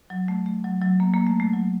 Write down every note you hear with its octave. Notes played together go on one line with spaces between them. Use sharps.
F#3
A3
A3
F#3
F#3
A#3
A#3
A3
A3
F#3